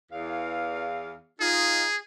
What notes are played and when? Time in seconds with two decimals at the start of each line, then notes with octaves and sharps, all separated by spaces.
0.12 E2 F5
1.41 D#4 F4 G#4